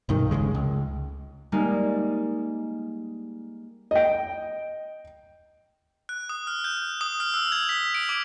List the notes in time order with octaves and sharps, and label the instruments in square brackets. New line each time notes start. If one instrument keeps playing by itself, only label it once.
[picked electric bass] B1 G2 D#3
F1 E2 C#3 G#3
C#2
[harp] G3 G#3 A#3 D#4
[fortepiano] D#5 G5
[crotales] F#6
D#6
F6
G6
D#6
F6
E6
G#6
B6
D7
D6